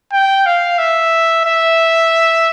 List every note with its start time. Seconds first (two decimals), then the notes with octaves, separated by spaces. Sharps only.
0.13 G5
0.46 F5
0.78 E5
1.45 E5